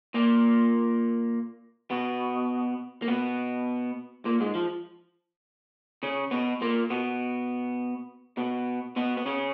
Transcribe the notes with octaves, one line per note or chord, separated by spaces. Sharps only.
A#2 A#3
B2 B3
A#3
B2 B3
A#2 A#3
G#2 G#3
F3
C#3 C#4
B2 B3
A#2 A#3
B2 B3
B2 B3
B2 B3
B3
C#3 C#4